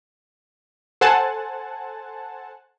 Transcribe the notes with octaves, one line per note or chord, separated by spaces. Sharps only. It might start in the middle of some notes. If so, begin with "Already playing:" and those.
A4 C5 F#5 G#5 A5